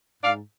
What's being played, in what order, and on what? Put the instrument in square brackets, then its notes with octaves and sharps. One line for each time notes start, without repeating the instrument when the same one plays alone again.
[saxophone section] G#2 D5 F5